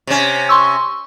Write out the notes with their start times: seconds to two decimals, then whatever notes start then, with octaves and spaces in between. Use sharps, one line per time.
0.07 C3 C#4
0.49 C6 C#6 E6